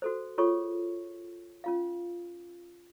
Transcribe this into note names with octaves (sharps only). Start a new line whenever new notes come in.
F#4 A4 C5
F4 G#4 A4 C#5 C#6
C#4 F4 F5